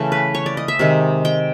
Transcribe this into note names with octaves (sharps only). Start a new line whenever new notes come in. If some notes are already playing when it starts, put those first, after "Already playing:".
Already playing: C#3 E3 A3
B4
C#5
D5
D#5
E5
C3 D#3 G#3
G5